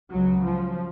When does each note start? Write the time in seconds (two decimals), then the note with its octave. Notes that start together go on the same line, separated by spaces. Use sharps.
0.10 C#2 C#3 F#3
0.44 F3